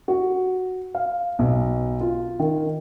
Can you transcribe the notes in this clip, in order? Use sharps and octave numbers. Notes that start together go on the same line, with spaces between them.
F#4
F5
B1
F4
D#3